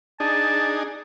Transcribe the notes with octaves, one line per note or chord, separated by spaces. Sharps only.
D4 D#4 G#4 A5